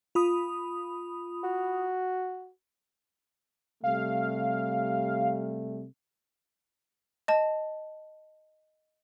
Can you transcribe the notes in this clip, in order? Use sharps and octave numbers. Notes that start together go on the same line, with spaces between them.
F4 B5 D#6
F#4
C3 G3 A3 F5
D#5 A5